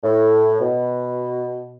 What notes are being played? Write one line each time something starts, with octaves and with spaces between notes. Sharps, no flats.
A2
B2